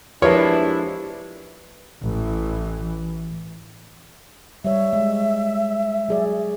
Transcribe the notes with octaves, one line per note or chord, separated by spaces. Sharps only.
F3 G#3 A#3 D4 E4 G4 B4 C#5
A1 E3
G3 C#5 E5
G#3
F#3 G#4 D5